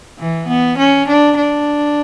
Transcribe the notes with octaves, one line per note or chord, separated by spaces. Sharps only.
E3
B3
C#4
D4
D4